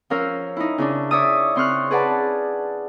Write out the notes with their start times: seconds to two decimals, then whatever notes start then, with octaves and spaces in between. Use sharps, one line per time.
0.10 F3 C#4 A#4 F5 E6
0.57 D#4 E4
0.78 C#3 C#4 D4
1.11 C#5 D5 E5 D#6
1.55 C#3 C4 C6 C#6 F6 F#6
1.91 G#4 B4 D5 F#5 A5